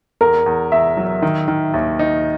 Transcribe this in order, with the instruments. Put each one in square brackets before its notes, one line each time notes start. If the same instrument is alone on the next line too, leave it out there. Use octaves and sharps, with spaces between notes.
[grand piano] E2 [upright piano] A#4
[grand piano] E2
[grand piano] E2 [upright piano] E5
[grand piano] F#3
D#3
D#3
[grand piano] D#2 [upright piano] E5
[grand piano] D#4